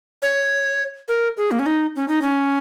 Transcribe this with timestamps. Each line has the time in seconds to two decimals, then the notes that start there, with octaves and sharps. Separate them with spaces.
0.22 C#5
1.08 A#4
1.37 G#4
1.51 A#3
1.59 C#4
1.66 D#4
1.96 C#4
2.08 D#4
2.22 C#4